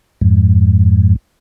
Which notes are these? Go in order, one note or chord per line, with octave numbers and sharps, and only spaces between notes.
F2 G#2